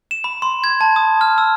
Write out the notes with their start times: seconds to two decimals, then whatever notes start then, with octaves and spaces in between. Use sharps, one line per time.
0.11 E7
0.24 B5
0.42 C6
0.64 G#6
0.81 A5
0.96 D#6
1.21 F6
1.38 E6